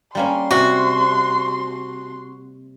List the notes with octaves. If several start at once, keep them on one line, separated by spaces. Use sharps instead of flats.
G3 A#3 C#4 C6
C3 F#4